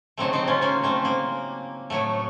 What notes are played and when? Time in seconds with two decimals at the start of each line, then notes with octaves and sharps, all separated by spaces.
0.17 C#3 F#3 A3 C4 D#4
0.33 C4 D#4
0.48 C#4 F4
0.62 A#3 C#4
0.83 A3 C4
1.05 A#3
1.90 A2 F#3 A3